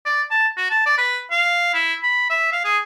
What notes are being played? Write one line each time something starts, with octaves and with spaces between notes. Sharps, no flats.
D5
A5
F#4
A5
D5
B4
F5
E4
B5
E5
F5
G#4